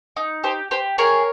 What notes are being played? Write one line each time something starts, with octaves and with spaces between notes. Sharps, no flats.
D#4
G4 C5
G4 C5
G#4 A#4 C#5